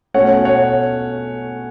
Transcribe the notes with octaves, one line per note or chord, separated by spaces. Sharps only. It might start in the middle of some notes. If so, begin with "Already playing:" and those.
B2 A3 C#4 C#5 F#5
C#5 F#5